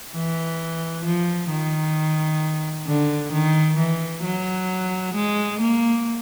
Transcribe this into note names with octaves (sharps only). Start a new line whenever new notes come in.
E3
F3
D#3
D3
D#3
E3
F#3
G#3
A#3